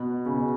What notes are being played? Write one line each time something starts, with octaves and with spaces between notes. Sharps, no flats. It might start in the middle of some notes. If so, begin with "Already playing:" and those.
Already playing: B2
C#3
B2